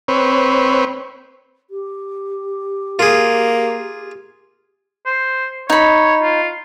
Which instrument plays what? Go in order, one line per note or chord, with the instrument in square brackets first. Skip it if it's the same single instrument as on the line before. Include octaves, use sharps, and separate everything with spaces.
[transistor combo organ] C4 B4 C#5
[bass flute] G4
[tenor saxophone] A#3 [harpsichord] F4 G#4
[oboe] C5
[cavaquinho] D#4 B5 [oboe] C#5
[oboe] F4